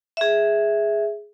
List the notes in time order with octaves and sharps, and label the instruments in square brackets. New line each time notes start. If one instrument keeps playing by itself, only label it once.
[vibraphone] G#4 E5